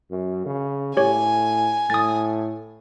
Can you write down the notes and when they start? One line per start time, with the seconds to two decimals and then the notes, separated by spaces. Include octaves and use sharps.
0.11 F#2
0.46 C#3
0.97 A2 G4 C#5 G#5
1.90 A2 D#6 A6